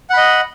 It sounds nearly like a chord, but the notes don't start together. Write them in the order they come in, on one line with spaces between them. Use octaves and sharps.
F#5 B5 D#5